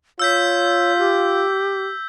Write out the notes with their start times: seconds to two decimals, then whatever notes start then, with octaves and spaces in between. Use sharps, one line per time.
0.19 F4 C#5 E6 G6 B6
0.98 G4